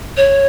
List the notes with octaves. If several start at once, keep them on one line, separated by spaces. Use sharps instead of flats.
C#5